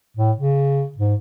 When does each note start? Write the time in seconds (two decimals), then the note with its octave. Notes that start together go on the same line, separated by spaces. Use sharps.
0.17 A2
0.37 C#3
0.97 G#2